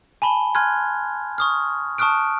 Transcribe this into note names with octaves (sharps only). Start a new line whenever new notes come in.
G#5 A5 B5 G7
G#5 C6 F6 F#6 G#6
C#6 D#6 F6
A5 C#6 D#6 F6 F#6 D7